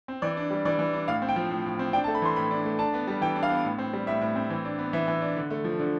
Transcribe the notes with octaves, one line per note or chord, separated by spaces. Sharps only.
C4
E3 D5
D4
G3
E3 D5
E3
D4
A2 F5
C4
G5
F3
A2
A2
C4
D4 G5
A5
A3
B5
E3 C6
A2 B5
D4
A3
D4 A5
B3
G3
E3 G5
D4
F5
B3
A2
C4
G3
A2 E5
A2
C4
E3
D4
B3
E3 E5
E3
D4
D3
A3
F3
D3